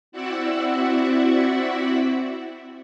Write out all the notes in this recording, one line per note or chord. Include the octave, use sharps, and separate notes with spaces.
C4 E4 F#4 D5 E5 F#5